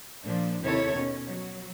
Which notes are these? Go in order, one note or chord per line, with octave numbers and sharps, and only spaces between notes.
A#2 F3 D4
D#2 C3 D#3 E4 A4 C#5
B2 C#4
F#3